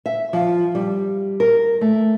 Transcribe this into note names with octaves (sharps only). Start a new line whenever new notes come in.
E5
F3
G3
A#4
A3